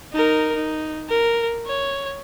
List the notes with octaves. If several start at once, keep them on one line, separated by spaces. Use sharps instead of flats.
D#4 A#4
D#4
A#4
C#5